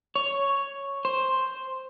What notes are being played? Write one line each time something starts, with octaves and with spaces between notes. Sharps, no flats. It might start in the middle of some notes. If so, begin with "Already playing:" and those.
C#5
C5